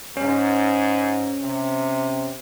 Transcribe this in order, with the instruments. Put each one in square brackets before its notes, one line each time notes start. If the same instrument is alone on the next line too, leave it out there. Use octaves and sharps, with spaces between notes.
[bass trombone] G#2 [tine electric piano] C#4
[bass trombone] C3